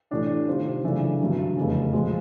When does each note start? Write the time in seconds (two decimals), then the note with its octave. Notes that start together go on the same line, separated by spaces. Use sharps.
0.11 A2 E3 A3 D4 G4
0.47 C3 D#3 G3 C4 F4
0.84 F#2 C#3 E3 A3 D4
1.21 G2 D3 F#3
1.57 F1 E2 C#3
1.94 A#2 F3 G#3